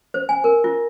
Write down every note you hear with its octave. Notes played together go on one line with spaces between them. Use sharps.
C5
G#5
A#4
F4